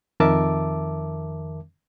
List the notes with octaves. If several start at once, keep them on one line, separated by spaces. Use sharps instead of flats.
F2 D#3 A#4 E5 A5 D6